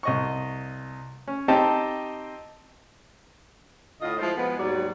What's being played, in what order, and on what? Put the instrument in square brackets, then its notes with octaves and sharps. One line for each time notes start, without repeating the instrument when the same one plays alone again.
[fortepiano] C2 D#5 C#6
C#4
C4 D#4 G4 D#5 A5
[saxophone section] A2 D3 F4 D#5
F3 G#3 E4 F4 C5
B2 F3 G#3 B3
D#2 G#2 F#3 G3 F#4 D5